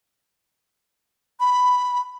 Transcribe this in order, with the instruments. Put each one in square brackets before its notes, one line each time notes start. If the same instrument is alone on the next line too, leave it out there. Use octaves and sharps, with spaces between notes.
[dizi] B5